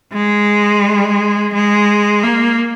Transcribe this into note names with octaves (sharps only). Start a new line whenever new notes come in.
G#3
G#3
A#3